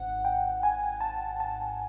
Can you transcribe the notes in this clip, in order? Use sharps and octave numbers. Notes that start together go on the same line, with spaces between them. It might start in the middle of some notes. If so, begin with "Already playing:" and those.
Already playing: G#1 G#2 F#5
G5
G#5
A5
A5